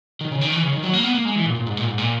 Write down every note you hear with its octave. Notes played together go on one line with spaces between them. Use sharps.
D#3
C#3
D#3
E3
C#3
D#3
F#3
A#3
B3
A#3
G#3
E3
A#2
A#2
G#2
A#2
G#2
A#2